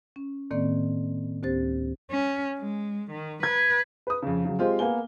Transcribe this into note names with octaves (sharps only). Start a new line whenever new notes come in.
C#4
A2 D#3 A#3 C4 D5
D2 C4 G4 C5 A6
C#4
G#3
D#3
B4 G#6
B4 D#6
F2 C#3
C#3 F#3
G#3 C4 F4 G4 C5
A#3 B3 G#5 G7